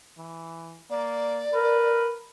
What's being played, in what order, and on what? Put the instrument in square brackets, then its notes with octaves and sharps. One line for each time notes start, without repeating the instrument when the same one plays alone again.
[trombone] E3
[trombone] A#3 [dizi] D5
[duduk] A#4 [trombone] B4